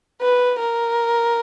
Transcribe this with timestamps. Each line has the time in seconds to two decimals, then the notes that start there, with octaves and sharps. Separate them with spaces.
0.21 B4
0.59 A#4